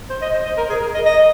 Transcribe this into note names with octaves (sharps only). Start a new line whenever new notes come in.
C5
D#5
C5
D#5
A#4
G#4
A#4
D#5
D#5